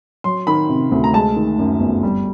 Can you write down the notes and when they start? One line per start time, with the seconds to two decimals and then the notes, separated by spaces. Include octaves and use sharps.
0.24 F#3 C6
0.47 D#3 B5
0.69 C3
0.92 D2
1.04 A#5
1.13 G#3 A5
1.36 D#3
1.59 F#2
1.80 G1
2.03 G3